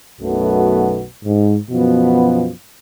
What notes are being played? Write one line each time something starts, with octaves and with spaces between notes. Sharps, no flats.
B1 F#2 B2 A3 B3 F#4
G#2
F#2 B2 F3 B3